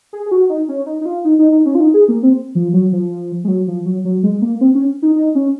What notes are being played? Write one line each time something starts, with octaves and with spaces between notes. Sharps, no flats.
G#4
G#4
F#4
D#4
C#4
D#4
D#4
F4
D#4
D#4
D#4
C#4
F4
D#4
G#4
A#3
C4
F3
F#3
F3
G#3
F#3
F3
F#3
F#3
G#3
A#3
C4
C#4
D#4
D#4
C#4